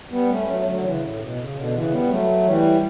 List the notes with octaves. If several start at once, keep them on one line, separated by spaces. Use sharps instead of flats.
G3 B3
A3 C#4
F#3 A3
D3 F#3
C#3 E3
A2
B2
C#3
B2 D3
C#3 E3
G3 B3
F#3 A3
E3 G3